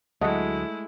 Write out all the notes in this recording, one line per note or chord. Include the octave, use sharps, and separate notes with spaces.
D2 F#3 G#3 A3 E4 D#5 F#5